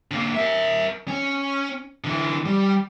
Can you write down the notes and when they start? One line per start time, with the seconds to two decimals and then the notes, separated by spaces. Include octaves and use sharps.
0.11 D3 A#3
0.34 A#4 E5
1.08 C#4
2.04 D3 E3
2.46 G3